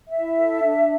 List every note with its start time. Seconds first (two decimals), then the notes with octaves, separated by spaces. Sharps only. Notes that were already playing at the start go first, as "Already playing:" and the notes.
0.08 E5
0.17 E4
0.39 A4
0.62 D4